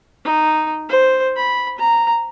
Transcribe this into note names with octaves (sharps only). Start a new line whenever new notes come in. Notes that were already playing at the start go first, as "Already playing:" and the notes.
D#4
C5
B5
A#5